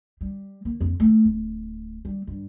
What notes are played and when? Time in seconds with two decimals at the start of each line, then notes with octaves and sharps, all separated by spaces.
0.21 G3
0.65 A#3
0.81 F2
1.00 A3
1.25 D1
2.05 G3
2.27 G2